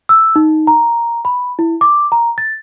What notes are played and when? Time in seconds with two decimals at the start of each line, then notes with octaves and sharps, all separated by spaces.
0.09 E6
0.36 D#4
0.67 A#5
1.25 B5
1.59 E4
1.81 D6
2.12 A#5
2.38 A6